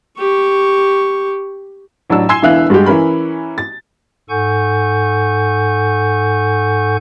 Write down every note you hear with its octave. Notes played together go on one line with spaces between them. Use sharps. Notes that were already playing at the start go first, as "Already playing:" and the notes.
G4 C#6
A1 F#3 D4 D5 E6
G#5 C6 E6 G#6 C7 G7
E1 D3 E3 E5 F5 F#6
G2 G#3 F#4 G4
E3 C#4 A#4 B5
A6
G#2 A4 F#5 G#5 C#6 G6